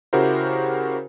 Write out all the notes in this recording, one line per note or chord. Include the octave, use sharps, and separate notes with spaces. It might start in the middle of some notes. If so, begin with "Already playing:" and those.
C#3 E4 F#4 G4 A#4 C5